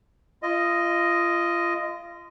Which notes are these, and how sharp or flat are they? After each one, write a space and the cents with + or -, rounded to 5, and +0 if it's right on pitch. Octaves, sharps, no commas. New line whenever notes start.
F4 -30 D#5 +0